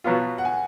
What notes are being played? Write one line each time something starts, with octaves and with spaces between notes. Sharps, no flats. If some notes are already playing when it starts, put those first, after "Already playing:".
B2 F#3 B3 F4
F#5
G#5